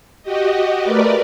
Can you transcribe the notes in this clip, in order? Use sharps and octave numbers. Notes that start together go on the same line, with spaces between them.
F#4 G4 D#5
A3 A#4 B4 D5